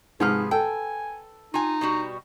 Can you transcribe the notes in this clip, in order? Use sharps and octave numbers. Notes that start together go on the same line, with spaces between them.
G#2 C3 F3 G#4 B4 F6
A4 G5 G#5
D#4 F4 G#5
B2 G3 F#4